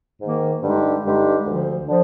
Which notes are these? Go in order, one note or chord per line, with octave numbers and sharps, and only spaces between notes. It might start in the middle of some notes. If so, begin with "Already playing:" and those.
G#2 D#3 A#3
G2 D3 G#3 D#4 G4
G2 D3 G#3 D#4 G4
D2 D3 F3
D3 F3